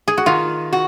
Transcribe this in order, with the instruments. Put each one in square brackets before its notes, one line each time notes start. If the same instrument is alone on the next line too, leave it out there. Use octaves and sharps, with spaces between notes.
[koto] G#4
F#4
[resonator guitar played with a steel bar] D#3 [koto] F4
[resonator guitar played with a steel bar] F#4